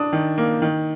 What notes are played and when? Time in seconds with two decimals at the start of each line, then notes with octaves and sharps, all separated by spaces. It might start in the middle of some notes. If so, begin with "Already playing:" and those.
Already playing: D4 D#6
0.13 D#3
0.38 A#3
0.62 D#3